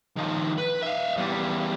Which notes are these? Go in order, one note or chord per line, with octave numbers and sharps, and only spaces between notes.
D#3 F3
B4
E5 F5
E2 G3